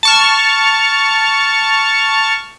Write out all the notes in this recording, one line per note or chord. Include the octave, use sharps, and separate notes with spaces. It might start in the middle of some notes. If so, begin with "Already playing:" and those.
A5 C#6 F6